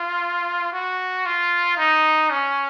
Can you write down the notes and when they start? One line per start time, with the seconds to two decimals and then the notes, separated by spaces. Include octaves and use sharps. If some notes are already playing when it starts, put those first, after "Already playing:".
Already playing: F4
0.73 F#4
1.26 F4
1.77 D#4
2.31 C#4